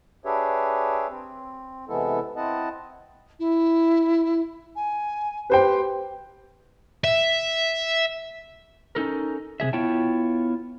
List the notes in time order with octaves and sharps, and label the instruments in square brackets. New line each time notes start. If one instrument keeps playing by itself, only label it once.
[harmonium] D4 G4 G#4 B4 C#5 E5
C4
C3 E3 G#3 B3 E4 A4
C4 E4 D#5 F#5 A5
[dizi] E4
G#5
[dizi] G4 [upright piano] B4 C5 G5
[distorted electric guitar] E5
[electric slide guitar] C#4 D#4 A4 A#4
C3 G3 G#4 E5
B3 E4 F4 C#5 G5 A5